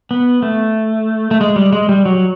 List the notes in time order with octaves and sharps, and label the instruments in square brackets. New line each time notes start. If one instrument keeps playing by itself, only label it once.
[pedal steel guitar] B3
A3
A3
G#3
G3
G#3
G3
F#3